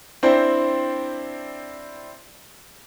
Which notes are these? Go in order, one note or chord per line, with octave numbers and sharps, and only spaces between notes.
C4 D4 E4 C5